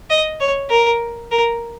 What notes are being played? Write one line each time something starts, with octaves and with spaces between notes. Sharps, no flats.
D#5
C#5
A#4
A#4